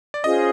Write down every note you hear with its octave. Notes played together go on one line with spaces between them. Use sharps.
D5
C#4 F4 G#4 C5 D#5